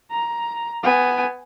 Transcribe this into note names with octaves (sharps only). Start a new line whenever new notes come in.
A#5
B3 G#5